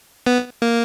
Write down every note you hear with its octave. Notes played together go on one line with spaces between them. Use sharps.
B3
A#3